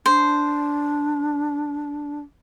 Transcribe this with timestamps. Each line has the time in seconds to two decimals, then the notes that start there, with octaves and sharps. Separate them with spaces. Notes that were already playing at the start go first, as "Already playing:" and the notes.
0.06 D4 C5